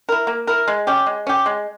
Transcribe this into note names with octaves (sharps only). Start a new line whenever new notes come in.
E4 A#4
A#3
E4 A#4
G#3
C#4 G4
G#3
C#4 G4
G#3